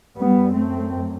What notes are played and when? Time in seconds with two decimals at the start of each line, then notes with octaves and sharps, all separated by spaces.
0.17 F#2 G3 B3
0.54 A3 C4